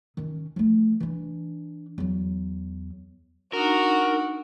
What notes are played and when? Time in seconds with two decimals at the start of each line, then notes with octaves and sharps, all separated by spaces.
0.17 D#3 C#4
0.56 F3 A3
1.00 E3 D4
1.98 E2 F#3
3.53 D4 D#4 F#4 A#4